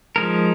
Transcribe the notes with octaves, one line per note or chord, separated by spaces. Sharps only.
F3 G#3 D#4 A#4